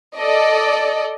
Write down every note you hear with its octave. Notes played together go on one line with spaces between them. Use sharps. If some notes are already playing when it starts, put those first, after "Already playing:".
A4 D5 D#5